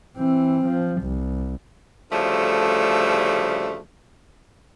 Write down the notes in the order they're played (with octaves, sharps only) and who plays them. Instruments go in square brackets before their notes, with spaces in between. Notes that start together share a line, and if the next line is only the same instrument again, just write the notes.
[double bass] E3 C4
F3
C2
[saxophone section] D2 C#3 F3 G3 A3